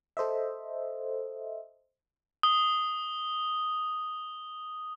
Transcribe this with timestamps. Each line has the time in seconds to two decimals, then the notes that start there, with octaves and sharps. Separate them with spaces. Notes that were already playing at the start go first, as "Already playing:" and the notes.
0.17 A4 C5 D#5 E5
2.43 D#6 G7